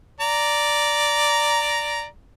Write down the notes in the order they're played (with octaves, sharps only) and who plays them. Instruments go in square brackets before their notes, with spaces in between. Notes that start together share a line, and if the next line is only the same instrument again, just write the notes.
[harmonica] D5 A#5